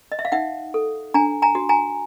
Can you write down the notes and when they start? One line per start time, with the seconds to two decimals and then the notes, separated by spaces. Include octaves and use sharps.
0.12 D#5
0.19 E5
0.25 F5
0.32 D#4 E5 F#5
0.74 A4
1.14 D4 G#5 A#5
1.42 G#5 A#5
1.55 F#4
1.69 G#5 A#5